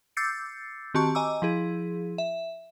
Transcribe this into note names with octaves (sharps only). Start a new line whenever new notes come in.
D6 E6 G6 A6 C7 C#7
D#3 C4 F#4 G4 A5 C#6
D#5 G#5 A#5 D6 E6
F3 E4 G#4
E5